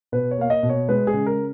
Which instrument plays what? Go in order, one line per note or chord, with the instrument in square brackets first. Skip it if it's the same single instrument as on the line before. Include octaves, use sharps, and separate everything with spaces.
[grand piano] B2 B4
C#5
A#3 F5
D#5
B2
C#5
G#3 B4
G#4
C#3
A#4